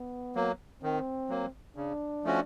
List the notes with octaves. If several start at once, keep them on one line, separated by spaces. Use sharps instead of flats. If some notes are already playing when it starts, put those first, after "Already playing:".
Already playing: B3
F#3 A#3
D#3 C4
F#3 A#3
C#3 D4
F3 A3 C#4 F#4